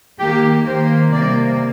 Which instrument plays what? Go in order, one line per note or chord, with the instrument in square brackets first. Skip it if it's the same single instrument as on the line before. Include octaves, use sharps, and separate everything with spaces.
[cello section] D#3 A#3 G4
D#3 A#3 C5
C3 G3 A#3 D5